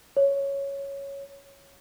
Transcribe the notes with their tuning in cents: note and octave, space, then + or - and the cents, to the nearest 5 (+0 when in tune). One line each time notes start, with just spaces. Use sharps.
C#5 +0